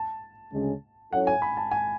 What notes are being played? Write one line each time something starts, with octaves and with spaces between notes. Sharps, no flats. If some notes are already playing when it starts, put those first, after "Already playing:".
Already playing: A5
D2 C#3 G#3 C#4
F#3 C#4 E4 A4 C#5 F#5
G#5
B5
A5
G#5